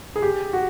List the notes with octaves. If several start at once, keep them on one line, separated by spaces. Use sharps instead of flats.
G#4
G4
F#4